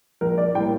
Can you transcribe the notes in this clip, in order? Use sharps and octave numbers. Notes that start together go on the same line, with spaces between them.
A#1 A#4
D5
A2 G3 A#3 G5